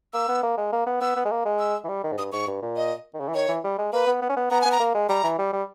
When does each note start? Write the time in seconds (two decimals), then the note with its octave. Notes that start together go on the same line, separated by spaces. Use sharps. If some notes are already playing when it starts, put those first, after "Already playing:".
0.14 A#3 E6
0.28 B3
0.43 A#3
0.57 G#3
0.72 A#3
0.86 B3
1.01 B3 E6
1.16 B3
1.25 G#3
1.31 A#3
1.45 G#3
1.59 E6
1.84 E3
1.88 G3
2.03 D#3
2.12 G#2
2.18 G2 D#6
2.32 G#2 C#6
2.47 G2
2.62 A#2
2.76 D#5
3.14 D#3
3.20 C#3
3.28 E3
3.34 D#3 C#5
3.48 E3
3.64 G3
3.78 G#3
3.93 A#3 B4
4.07 B3
4.22 B3
4.29 C#4
4.37 B3
4.51 B3 A#5
4.61 B3 G#5
4.72 A#5
4.80 A#3
4.95 G#3
5.09 G3 A#5
5.23 E3
5.38 G3
5.53 G3